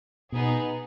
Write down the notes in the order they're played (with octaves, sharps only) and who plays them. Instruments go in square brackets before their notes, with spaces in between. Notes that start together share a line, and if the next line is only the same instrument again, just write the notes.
[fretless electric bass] B2 [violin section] B3 D#4 G#4